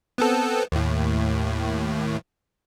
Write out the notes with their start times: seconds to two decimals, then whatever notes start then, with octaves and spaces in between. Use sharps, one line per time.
0.18 B3 C4 A4
0.72 D#2 A2